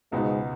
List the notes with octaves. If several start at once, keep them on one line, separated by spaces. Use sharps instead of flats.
C#2 G#2 B2 G#3 B3 D#4 F#4